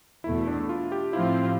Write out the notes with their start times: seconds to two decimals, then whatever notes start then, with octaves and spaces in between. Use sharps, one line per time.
0.24 E2 B2 A3 E4
0.48 D4
0.69 F4
0.92 G4
1.13 A2 F3 C4 E4 F4